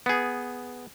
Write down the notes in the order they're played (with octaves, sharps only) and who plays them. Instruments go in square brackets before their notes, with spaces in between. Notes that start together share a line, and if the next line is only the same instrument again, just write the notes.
[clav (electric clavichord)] B3 G#4